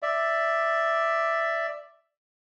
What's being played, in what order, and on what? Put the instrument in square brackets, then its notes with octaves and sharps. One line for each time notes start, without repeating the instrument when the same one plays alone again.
[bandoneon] D5 E5